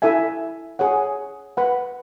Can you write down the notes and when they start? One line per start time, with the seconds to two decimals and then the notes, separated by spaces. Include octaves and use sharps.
0.02 E4 A4 E5 G#5
0.79 G#4 C#5 F#5
1.57 B4 F#5 B5